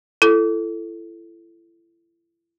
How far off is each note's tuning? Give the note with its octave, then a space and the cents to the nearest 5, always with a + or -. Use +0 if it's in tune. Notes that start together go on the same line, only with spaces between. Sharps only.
E4 +35 A4 +0